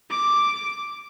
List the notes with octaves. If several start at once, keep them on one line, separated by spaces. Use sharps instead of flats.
D6